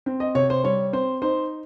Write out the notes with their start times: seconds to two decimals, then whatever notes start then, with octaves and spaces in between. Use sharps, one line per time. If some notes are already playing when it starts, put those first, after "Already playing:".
0.06 C4
0.20 D#5
0.35 C3 C#5
0.50 C5
0.64 G3 C#5
0.93 C4 C5
1.22 D#4 C5